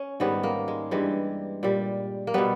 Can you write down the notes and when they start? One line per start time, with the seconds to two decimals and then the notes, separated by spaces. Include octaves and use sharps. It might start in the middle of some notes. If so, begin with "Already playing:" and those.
Already playing: C#4
0.20 G#2 D#3 G3 B3
0.43 A#3
0.68 G#3
0.91 G2 E3 G3 G#3
1.63 A#2 G3
2.27 A#3
2.34 B2 G3 B3